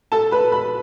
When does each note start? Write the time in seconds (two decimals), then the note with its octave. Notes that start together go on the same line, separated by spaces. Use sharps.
0.12 A4 A5
0.31 B4 B5
0.52 B4 B5